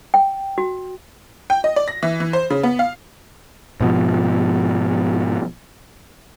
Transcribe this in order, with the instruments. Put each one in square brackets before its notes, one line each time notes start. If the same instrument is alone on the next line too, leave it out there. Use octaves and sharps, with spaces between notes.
[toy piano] G5
F#4
[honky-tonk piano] G5
D#5
D5
A#6
E3
E3
C5
C#3
B3
F5
[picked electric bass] G#2 B2 F3